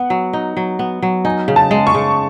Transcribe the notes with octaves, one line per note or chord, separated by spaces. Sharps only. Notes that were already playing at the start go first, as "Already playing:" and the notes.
Already playing: B3 F#5
F#3
D#4
F#3
B3
F#3
D#4 G#5
C#3
A5
G#3
C#6
C#3